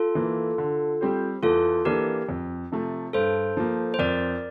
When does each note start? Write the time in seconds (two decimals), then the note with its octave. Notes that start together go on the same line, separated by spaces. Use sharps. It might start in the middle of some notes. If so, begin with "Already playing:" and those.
Already playing: F4 A4
0.15 E3 A#3
0.58 D3
1.01 G3 C4 G4 C5
1.43 E2 F4 A4
1.85 E3 A#3 D4 G4 A4 A#4
2.29 F2
2.72 C3 F3 A3
3.13 G2 A4 C5
3.57 F3 A#3
3.94 C5
3.99 F2 A#4 D5